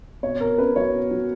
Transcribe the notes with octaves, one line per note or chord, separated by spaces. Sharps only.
B2 C#5
B2 A#4
C#4 B4
F#3 C#5
B2
F#3